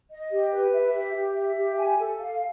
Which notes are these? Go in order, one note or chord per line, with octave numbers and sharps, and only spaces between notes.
D#5
G4
B4
E5
G4
G4
E5
G4
G#5
A4
F5